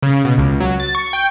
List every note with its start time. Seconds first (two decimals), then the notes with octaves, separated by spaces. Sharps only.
0.03 C#3
0.25 B2
0.38 C#2
0.60 F#3
0.80 A6
0.95 C#6
1.13 G5